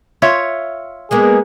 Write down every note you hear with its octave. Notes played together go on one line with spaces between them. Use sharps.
F4 C#5 E5
G#3 A#3 B3 G#4